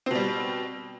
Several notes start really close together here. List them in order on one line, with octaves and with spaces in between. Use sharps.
C4 B2 G3